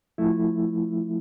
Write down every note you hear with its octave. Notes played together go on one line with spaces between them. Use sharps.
F3 A3 E4